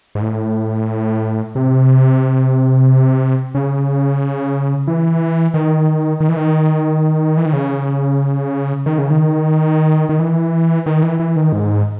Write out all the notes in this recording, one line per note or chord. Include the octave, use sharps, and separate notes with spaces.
G#2
A2
C3
C#3
E3
D#3
D#3
E3
D#3
E3
D#3
C#3
D#3
C#3
D#3
D#3
E3
D#3
E3
E3
D#3
G#2